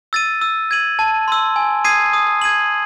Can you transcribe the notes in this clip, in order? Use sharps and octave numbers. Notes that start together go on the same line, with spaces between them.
E6 A6 D#7
E6
G#6 D#7 F#7
A5
C6 E6
G#5
D#6 G#6 C7 D#7
D#6
G#6 D#7 F#7